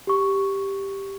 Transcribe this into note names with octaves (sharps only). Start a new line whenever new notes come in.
G4 C#6